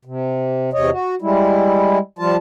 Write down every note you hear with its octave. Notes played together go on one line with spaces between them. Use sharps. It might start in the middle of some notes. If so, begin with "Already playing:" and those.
C3
E2 C3 C#5 D#5
F#4
G3 G#3 E4
F3 G3 F4 A5